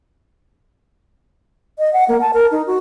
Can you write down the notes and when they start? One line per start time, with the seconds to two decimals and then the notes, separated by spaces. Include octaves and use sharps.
1.79 D#5
1.93 F#5
2.08 A#3
2.21 A5
2.33 A#4
2.51 D#4
2.67 F#4